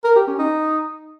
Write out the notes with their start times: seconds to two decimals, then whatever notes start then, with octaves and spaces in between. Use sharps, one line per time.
0.04 A#4
0.16 G4
0.27 C#4
0.39 D#4